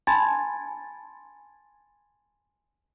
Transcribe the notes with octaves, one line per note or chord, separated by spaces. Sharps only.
G#5 A5 B5 C6 G#6 A6